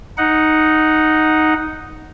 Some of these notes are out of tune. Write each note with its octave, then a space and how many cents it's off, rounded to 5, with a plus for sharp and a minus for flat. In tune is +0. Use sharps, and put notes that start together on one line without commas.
D#4 +0 F#5 +0